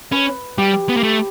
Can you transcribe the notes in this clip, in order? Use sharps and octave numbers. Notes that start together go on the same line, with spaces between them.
C#4 B4
G3 G4
B3
A#3
A3